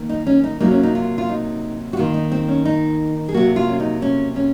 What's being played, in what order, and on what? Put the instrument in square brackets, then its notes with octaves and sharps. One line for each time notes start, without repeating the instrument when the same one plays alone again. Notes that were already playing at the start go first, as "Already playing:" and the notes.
Already playing: [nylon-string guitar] D#3 A#3
D#4
C#4
D#4
C3 F#3 A#3 D#4
C#4
D#4
F4
F4
D#4
F#4
D#3 A#3 F4
D#4
C4
C#4
D#4
G#4
C3 F#3 A#3 F#4
F4
C#4
D#4
C#4
C#4